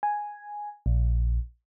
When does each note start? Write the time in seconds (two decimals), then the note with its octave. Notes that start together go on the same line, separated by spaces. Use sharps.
0.03 G#5
0.86 A#1